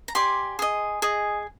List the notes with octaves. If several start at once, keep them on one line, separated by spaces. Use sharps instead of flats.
A#5
G4 D5 G#5 C6
G#4 D#5
G#4 D#5